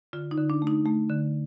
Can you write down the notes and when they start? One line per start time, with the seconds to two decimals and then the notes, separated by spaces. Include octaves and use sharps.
0.13 D3 F4
0.31 D#4
0.38 D3
0.50 D4
0.62 A3
0.67 D#4
0.85 A3
1.09 D3